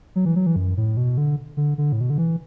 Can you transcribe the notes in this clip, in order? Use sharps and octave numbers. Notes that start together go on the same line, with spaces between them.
F#3
E3
F#3
E3
F#2
A2
B2
D3
D3
D3
A2
B2
D3
E3